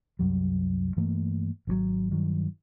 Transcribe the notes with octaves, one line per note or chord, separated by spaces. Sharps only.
C2 F#2 F#3 G3
G2 E3 A3 A#3
G#1 D#3 F#3
G2 D#3 F#3